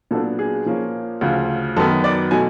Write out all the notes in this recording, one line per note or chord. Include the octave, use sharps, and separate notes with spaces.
A#2 F#3 B3 D4 A4
G#4
A#2 F3 A#3 C#4
D2 C#3 F3
F#2 D#3 F#3 B3 A4
D5
B2 F#3 A3 G#5